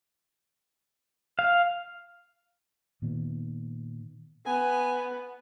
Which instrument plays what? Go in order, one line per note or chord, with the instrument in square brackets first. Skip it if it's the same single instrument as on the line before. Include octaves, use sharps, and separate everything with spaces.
[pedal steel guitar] F5
[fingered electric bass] A#2 D#3 B3
[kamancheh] B3 [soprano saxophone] G#5